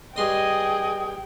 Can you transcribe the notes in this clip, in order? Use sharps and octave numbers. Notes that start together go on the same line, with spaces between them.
G2 G#4 D#5 G5 C6 D#6